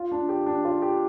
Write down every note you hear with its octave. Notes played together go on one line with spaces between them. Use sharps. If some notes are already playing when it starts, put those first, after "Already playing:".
Already playing: F4
D4
G4
D4
F4
G4